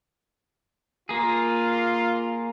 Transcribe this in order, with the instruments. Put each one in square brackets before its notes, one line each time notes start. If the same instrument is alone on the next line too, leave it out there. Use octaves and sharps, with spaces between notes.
[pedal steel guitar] A#3 G#4 [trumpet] F4